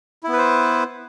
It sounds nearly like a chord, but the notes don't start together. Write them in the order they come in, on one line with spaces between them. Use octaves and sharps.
E4 B3 B4 C5